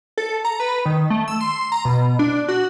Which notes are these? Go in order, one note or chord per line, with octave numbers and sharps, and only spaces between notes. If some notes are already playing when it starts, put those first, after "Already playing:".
A4
A#5
B4
D#3
A3
E6
C6
A#5
B2
D4
F#4